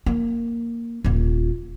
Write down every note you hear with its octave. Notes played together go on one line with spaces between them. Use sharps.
A#3
D#1 F4